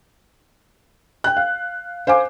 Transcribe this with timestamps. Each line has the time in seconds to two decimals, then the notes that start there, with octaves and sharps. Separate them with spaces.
1.24 G5 F#6
1.37 F5
2.07 C5 F5 G#5 D6